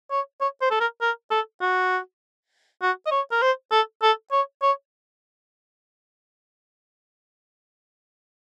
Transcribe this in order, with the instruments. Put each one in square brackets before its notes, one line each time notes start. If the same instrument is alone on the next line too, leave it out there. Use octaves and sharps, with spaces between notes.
[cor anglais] C#5
C#5
C5
A4
A#4
A#4
A4
F#4
F#4
D#5
C#5
A#4
C5
A4
A4
C#5
C#5